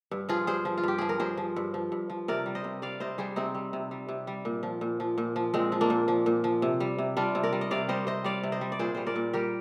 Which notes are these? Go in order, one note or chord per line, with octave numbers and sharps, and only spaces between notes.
G2
F3 F4 G#4
G2 G#4 C5
F3
F4
G2 G4
F3 G#4
A#4
G2 G#4 C5
F3
G2
F3
G2
F3
C3 A#4 D5
G3
C5 D#5
C3
G3 D5 F5
C3 C5 D#5
G3 G#4 C5
C3 C4 D#4
G3
C3
G3
C3
G3
A#2
F3
A#2
F3
A#2
F3
A#2 G#3 C4
F3
A#3 D4
A#2
F3
A#2
F3
C3
G3
C3
G3 D4 F4
C3
A#4 D5
G3
D#5
C3 D5 F5
G3 C5 D#5
C3 C5 D#5
G3 D5 F5
C3
C5 D#5
G3
D5
A#2 G#4 C5
G3 C5
A#4 D5
A#2
G3 G4 A#4